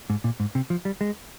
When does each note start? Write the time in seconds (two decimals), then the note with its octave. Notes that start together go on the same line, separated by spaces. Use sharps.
0.10 G#2
0.24 A#2
0.40 G#2
0.55 C3
0.70 F3
0.85 G3
1.01 G#3